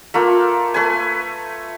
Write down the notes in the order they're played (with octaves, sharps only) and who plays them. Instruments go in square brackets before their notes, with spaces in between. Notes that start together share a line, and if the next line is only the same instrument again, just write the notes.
[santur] A3 A#3 F4
A3 B4 G#5